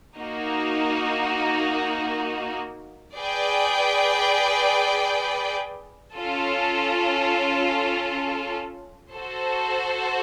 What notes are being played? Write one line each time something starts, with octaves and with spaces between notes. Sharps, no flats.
A#3 D#4 F#4
G#4 B4 D5 G5
C#4 F4 A4
F#4 A4 C5